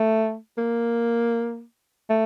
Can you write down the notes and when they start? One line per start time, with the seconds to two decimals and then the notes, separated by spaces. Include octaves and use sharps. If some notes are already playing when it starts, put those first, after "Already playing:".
Already playing: A3
0.58 A#3
2.10 A3